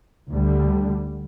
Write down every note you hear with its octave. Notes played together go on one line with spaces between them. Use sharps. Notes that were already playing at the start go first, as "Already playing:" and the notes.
D2 D3 G3